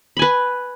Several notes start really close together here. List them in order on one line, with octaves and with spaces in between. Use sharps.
B5 G#5 B4